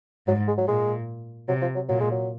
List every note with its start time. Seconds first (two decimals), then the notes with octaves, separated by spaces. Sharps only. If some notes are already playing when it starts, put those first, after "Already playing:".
0.27 G#2 F#3
0.48 G#3
0.58 F#3
0.68 A#2 G#3
1.48 C3 F#3
1.62 F3
1.75 F#3
1.89 A#2 F#3
2.00 G#3
2.12 F#3